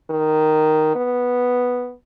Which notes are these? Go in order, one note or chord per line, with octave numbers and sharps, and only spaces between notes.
D#3
B3